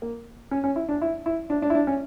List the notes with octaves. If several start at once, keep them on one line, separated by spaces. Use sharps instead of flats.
A#3
C#4
C#4
E4
D4
E4
E4
D4
D4
E4
D4
C#4